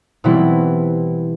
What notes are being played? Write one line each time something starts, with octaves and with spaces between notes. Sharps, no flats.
B2 E3 G3 C4 E4